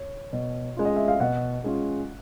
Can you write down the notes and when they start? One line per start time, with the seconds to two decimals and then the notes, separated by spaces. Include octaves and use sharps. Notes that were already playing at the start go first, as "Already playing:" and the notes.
Already playing: C#5
0.33 B2
0.77 G#3 C#4 F4
0.85 D#5
0.96 E5
1.08 F5
1.20 B2 F#5
1.64 G#3 C#4 F4